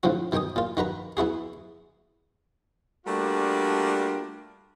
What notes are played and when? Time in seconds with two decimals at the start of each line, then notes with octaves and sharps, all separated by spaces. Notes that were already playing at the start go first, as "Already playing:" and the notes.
0.03 A2 D3 F3 C4 F#4
0.32 B2 D#3 G5 G#5 D#6
0.56 A#2 F4
0.77 D#3 F#4 B4 A#5
1.17 B3 E4 F#4 G#4
3.07 G3 A3 A#3 D4 F4 F#4